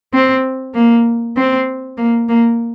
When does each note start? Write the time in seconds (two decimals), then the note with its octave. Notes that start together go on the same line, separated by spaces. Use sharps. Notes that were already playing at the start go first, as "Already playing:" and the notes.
0.13 C4
0.75 A#3
1.37 C4
1.98 A#3
2.29 A#3